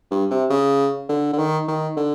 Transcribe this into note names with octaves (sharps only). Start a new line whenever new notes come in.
G2
C3
C#3
D3
D3
D#3
D#3
D3